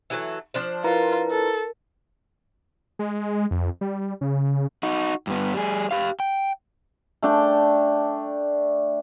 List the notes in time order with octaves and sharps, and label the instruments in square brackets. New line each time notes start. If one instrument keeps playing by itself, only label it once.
[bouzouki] E3 F#3 A3
F3 D4 C5
[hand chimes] E4 B4 A#5 [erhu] F4 [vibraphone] A#4
[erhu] A4
[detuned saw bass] G#3
F2
G3
C#3
[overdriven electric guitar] D#4 F#4
G2 B3
G3 G#4
G4 F5
G5
[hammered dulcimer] A3 D4 G5